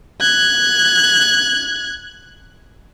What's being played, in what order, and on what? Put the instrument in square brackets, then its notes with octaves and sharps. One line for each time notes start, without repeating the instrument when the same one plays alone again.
[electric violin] F#6 G#6